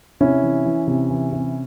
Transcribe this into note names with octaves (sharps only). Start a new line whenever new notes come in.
C3 C#4 E4
E3
E3
C3
E3
C3